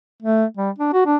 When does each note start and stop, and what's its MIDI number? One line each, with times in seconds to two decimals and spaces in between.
0.22 0.45 57
0.57 0.70 55
0.78 0.92 62
0.93 1.02 66
1.06 1.16 62